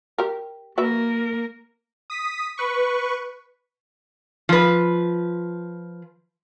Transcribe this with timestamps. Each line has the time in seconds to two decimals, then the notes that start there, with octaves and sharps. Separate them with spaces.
0.18 G4 A#4
0.78 A#3 F#4 A#4 B4 E5
2.10 D#6 B6
2.58 B4 C#6
4.49 F3 B4